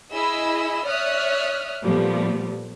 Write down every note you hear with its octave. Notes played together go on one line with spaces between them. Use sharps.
E4 G#4 D#5 B5 E6
C#5 D5 E5 D#6 F6 F#6
A#2 F3 G3 A3 B3